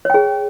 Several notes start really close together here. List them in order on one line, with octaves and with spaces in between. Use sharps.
C#5 G5 G#4